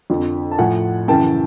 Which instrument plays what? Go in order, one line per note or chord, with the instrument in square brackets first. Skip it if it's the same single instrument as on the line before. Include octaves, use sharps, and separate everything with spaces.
[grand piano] F2 D3 F3
A5
A2 F3 F#5 G#5
F#2 C#3 E3 G5 A5